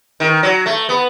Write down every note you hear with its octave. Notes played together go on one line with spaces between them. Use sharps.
D#3
F#3
A3
B3